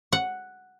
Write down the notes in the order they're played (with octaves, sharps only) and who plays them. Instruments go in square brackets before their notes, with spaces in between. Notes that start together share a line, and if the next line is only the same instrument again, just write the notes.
[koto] F#5